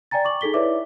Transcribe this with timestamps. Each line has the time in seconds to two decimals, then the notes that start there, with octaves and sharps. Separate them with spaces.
0.11 D5 G5 G#5 A#5 A6
0.25 C#6 D6 F#7
0.41 D#4 G#4 A4 B6 G7
0.54 E4 B4 C#5 D5 E5 D6